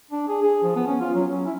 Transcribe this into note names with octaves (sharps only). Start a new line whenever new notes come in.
D4
G#4
G#4
F3
B3
C#4
F4
F#3
C#4
E4